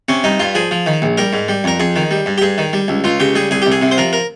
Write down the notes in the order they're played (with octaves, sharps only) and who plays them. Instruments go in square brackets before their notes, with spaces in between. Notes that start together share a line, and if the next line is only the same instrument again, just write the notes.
[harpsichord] C3 C#4
G2 D#4
G2 F4
F3 G#4
F3
D#3
A#1
G3 A#4
G#2
G3
F2 A#4
F2 G#4
D#3
G3
G2
G4
G2 G#4
D#3
G3
C#2
C#2 F4
C#3 G4
G3 G#4
C2 G#4
C2 G4
G#4
C3
C5
F3 A#4
A#4